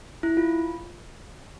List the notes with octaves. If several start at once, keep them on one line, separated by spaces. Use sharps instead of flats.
E4
F4